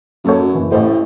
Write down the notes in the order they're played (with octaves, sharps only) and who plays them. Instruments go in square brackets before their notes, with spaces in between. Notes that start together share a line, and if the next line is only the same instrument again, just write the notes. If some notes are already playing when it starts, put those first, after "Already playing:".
[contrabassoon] F#2 [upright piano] A#3 A4 C#5
[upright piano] F#3
F#1 E3
[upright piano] A1 C5 [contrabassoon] A2